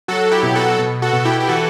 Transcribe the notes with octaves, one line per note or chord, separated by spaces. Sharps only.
F#3 F#4 A4
E4 G4
B2
F#4 A4
B2
F#4 A4
B2
E4 G4
G4
E3 F#4 A4